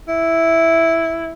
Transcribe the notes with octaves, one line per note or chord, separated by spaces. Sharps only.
E4